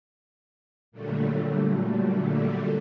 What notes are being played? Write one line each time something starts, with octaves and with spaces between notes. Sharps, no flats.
A#2 D3 F#3 G3 A3